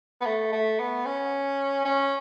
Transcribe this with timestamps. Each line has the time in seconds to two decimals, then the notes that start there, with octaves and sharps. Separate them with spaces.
0.21 B3
0.26 A3
0.52 A3
0.79 B3
1.06 C#4
1.85 C#4